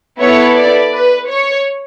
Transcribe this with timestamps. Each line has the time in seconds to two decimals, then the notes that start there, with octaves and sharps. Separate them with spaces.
0.19 B3 E4 A4 C#5
0.56 D5
0.93 B4
1.30 C#5